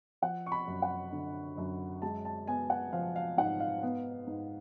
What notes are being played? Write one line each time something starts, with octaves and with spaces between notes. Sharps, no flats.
F3 F#5
C#6
B5
F#2
F#5
D3
F#2
G#3 A5
A5
B3 G#5
F#5
F3 F5
F5
G#2 F#5
F5
B3
G#2